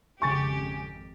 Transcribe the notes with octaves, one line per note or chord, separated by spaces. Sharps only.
G#1 F2 C#3 G4 G#5 C#6 A6